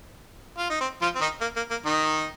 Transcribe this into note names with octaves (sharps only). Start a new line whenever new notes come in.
F4
D#4
C4
F3 F4
C4
D#3 D#4
A#3
A#3
A#3
D#3 D#4